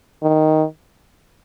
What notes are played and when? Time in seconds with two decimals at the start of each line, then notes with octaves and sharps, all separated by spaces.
0.23 D#3